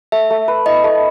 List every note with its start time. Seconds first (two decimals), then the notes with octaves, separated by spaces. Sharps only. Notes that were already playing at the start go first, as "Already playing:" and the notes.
0.12 A3 E5
0.30 A3
0.48 B4
0.66 E4 D#5
0.84 A3